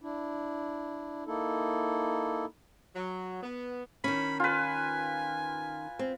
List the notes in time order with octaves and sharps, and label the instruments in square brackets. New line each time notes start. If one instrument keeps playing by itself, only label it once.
[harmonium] D4 E4
A#3 D#4 E4 A4
[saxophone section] F#3
B3
[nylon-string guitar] D#3 C#4 [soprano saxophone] B5
[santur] F4 B4 [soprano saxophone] G#5
[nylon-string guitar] C4